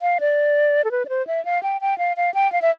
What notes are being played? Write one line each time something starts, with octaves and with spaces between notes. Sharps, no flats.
F5
D5
A4
B4
D5
C5
E5
F5
G5
G5
F5
F5
G5
F5
E5